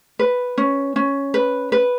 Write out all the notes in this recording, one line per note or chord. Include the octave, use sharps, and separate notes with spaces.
B4
C#4
C#4
B4
B4